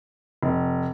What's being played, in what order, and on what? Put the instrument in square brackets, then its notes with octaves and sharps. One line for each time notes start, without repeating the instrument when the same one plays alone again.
[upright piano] F1